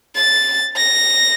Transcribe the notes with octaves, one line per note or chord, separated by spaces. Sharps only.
A6
A#6